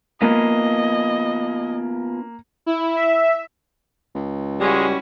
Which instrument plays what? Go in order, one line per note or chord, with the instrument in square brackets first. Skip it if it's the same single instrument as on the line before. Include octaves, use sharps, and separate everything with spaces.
[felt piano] A#3 [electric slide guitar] B3 C#4 F4 [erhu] D#5
[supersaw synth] E4
E5
[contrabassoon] C#2
[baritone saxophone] G3 [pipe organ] G#3 [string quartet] C#4 E4 F#4